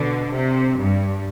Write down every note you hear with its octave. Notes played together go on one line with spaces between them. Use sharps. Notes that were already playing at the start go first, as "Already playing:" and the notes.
Already playing: B2 D3
C3
G2